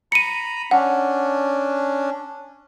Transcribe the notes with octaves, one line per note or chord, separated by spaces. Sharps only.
A#5 B5 C#7 D#7
C#4 D4 F#5